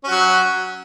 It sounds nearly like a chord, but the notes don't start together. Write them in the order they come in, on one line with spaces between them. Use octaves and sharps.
C#4 F#4 F#3